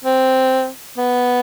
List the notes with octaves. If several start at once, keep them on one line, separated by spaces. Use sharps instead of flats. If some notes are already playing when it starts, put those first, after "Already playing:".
C4
B3